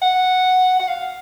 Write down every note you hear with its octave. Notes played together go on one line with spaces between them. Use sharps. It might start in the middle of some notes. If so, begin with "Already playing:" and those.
F#5
F#5
F5